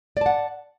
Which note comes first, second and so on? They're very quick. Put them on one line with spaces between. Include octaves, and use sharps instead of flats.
D5 A5 F#5